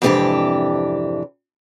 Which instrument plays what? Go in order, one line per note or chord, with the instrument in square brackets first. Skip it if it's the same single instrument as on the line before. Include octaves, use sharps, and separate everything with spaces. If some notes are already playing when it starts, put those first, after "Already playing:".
[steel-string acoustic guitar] F2 G#2 C3 E3 D4 G4